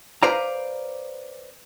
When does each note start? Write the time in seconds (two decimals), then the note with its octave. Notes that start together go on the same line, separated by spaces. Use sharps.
0.23 B4 C5 D5 F5 A#5